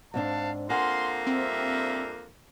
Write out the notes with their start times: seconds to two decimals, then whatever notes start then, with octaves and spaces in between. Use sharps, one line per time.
0.14 G#2 C4 D4 F5 F#5 A5
0.70 F2 F3 A#3 F#5 G#5 C6
1.27 G3 C4 D4 E5